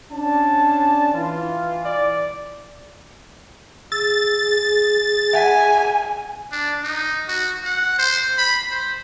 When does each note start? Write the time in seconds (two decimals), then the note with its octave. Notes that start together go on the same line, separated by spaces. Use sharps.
0.12 C#4 D4 A5
1.14 E3 F4
1.85 D5
3.92 G#4 E6 A6
5.33 E5 F#5 G#5 B6
6.52 D4
6.84 D#4
7.28 F#4
7.64 F#5
7.98 C5
8.38 B5
8.71 C5